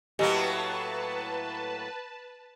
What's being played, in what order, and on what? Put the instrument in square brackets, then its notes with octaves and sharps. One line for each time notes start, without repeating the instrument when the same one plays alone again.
[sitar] A2 F#3 A#3 [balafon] G4 D#5 G#5 [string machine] B4 A5